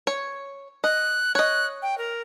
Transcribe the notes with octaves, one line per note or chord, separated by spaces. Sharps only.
C#5
D#5 F#6
C#5 D#5 F#6
G5
A#4